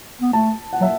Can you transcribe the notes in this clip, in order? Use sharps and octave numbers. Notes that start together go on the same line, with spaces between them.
B3
A3 A5
F#5
F#3 E5